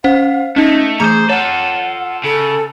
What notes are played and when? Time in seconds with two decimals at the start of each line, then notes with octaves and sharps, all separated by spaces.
0.04 C#4 C5 F5 F#5
0.56 A3 C#4 D#4 D#5
1.00 E3 A3 G#4 C5 C#5 A#5
1.29 F4 A4 C#5 F#5
2.24 C#3 A4